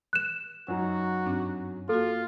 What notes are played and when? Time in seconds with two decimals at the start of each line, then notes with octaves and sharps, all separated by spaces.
0.13 F#6 E7
0.68 F#2 F#3 D#4 F#4
1.26 G2 C4 D4
1.89 A#3 F4 F#4 A4